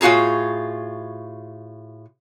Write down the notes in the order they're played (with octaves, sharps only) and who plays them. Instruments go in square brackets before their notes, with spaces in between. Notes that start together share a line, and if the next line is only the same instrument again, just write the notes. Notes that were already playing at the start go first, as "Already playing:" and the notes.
[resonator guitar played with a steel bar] A2 F4 F#4 G#4 A#5